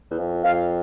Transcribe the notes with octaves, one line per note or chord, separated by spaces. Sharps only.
E2
F2
F2 F5